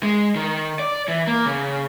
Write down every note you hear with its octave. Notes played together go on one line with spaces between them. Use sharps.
G#3
D#3
D5
E3
A#3
C#3